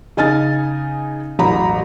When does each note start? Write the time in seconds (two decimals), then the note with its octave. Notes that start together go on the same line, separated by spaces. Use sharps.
0.17 C#3 D#4 D#5 G#5 F6 A6
1.39 E1 A1 F#3 A#5 B5